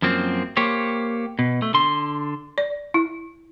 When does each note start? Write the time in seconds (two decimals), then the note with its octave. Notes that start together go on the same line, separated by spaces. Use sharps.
0.02 F#2 F3 A#3 C4
0.57 A#3 G4 C5 C#5
1.39 B2
1.62 A3
1.74 D3 C6
2.58 D5
2.94 E4